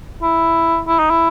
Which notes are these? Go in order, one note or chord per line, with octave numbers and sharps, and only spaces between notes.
E4
E4
D#4
E4